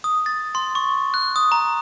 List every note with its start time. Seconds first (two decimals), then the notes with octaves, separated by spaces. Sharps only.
0.04 D#6
0.26 A6
0.55 C6
0.75 C#6
1.14 F#6
1.36 D#6
1.52 A#5